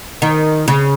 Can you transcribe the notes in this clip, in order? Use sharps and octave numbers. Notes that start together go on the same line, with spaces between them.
D#3
C#3